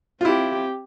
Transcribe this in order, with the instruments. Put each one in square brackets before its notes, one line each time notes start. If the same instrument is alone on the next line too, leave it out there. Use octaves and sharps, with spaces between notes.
[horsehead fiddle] C4 G4 [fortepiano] E4 F4